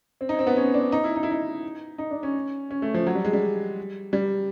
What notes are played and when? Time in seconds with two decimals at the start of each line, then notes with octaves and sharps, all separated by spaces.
0.21 C4
0.29 D#4
0.39 C4
0.47 B3
0.57 C#4
0.74 D4
0.92 D#4
1.04 E4
1.16 D#4
1.23 E4
1.31 D#4
1.98 D#4
2.11 D4
2.23 C#4
2.71 C#4
2.82 A3
2.94 F3
3.06 F#3
3.15 G3
3.25 G#3
3.33 G3
4.13 G3